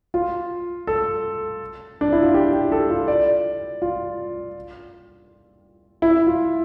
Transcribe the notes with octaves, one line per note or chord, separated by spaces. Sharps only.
F4
A4
D4
E4
F4
G4
G4
A4
F4
D5
F4
E4
F4